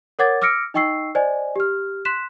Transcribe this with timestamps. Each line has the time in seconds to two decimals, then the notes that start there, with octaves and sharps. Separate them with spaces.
0.19 A#4 C#5 F#5 D6 G#6 A6
0.42 D6 E6 F6 A#6 C#7 D7
0.74 D#4 D#5 G5 C#6 E6 C7
1.15 C5 D5 D#5 G#5
1.56 G4 F6
2.05 C6 F#6 B6 E7